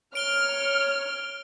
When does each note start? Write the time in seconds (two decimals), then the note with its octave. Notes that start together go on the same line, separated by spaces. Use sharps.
0.15 C#5 F6 D7 G7